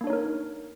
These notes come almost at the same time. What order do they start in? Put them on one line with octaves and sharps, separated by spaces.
A#3 D4 C#5 D#4 A#4